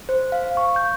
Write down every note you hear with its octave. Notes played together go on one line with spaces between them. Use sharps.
C5
F5
C#6
G6